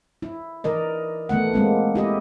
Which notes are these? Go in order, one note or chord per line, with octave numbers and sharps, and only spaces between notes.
E4
E3 A#4 D5 D#5
E3 A3 B3 F#5
G#3 A#3 C4
E4 G4 D#5